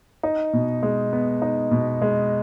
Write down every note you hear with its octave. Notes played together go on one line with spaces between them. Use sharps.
D#4
B2
G#3
B3
D#4
B2
G#3